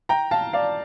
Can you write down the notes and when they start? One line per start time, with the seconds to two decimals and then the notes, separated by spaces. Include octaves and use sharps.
0.09 G5 A#5
0.31 F5 A5
0.53 D5 F5